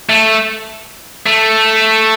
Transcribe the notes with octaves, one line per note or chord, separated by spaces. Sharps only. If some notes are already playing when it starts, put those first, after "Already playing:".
A3
A3